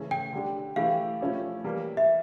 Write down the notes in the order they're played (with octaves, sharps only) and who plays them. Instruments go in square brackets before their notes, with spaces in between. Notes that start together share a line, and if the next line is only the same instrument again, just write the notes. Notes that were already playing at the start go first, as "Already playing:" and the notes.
Already playing: [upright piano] C#3 E3 A3 C#4
[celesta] G5
[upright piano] D3 G3 D4 G4
[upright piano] E3 A3 E4 G4 [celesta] F5
[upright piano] F3 A3 C#4 E4 G4
E3 G3 A#3
[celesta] E5